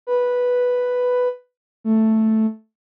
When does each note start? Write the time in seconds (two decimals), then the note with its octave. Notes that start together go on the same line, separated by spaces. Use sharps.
0.07 B4
1.84 A3